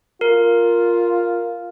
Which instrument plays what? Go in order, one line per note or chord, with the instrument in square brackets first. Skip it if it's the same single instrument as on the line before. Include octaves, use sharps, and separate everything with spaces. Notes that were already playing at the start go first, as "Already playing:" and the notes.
[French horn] F4 [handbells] A#4